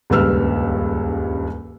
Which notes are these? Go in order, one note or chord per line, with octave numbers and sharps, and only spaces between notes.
D#1 C#2 G2 B4 E6 F6